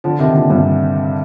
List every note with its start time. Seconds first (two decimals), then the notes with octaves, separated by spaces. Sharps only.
0.04 D3 F3
0.19 C3 D#3
0.34 A#2 D3
0.49 G2 A#2